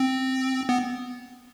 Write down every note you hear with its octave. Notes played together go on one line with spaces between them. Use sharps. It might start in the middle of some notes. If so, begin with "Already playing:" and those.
Already playing: C4
B3